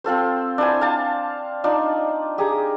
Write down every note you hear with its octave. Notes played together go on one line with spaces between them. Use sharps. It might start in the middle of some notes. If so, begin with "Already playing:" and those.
C4 F4 A4 C5
D4 E4 C5 G#5
F5 A5
D4 D#4 F4
G4 G#4 A#5